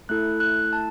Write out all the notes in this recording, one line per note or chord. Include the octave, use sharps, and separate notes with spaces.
A3 E4 A4 F#6
F#6
A5